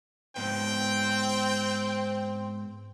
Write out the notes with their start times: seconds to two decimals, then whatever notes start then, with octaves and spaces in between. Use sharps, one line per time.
0.36 G#2 B3 C4 C5 G5